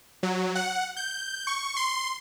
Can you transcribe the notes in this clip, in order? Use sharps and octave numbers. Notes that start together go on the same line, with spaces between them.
F#3
F#5
G6
C#6
C6